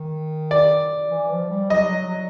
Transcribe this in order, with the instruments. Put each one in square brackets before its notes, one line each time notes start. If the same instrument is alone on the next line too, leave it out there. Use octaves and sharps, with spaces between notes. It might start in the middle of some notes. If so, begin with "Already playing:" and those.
Already playing: [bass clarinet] D#3
[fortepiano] D5
[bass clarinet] E3
F3
G3
[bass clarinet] F#3 [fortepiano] D#5
[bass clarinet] F#3
F#3